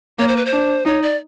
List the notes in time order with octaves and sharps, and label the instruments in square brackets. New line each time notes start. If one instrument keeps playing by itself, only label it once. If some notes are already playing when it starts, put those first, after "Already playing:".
[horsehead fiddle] A#3 [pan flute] C#5
[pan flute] C5
B4
C5
[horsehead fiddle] D4
[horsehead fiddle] D#4 [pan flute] C#5
[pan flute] D5